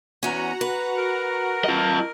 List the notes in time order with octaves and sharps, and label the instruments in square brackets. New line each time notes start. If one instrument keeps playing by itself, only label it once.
[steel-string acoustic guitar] E2 C#4 [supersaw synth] F#4 F#5 A#5
[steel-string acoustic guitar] B4
[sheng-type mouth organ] A#4
[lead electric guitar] F4 D#5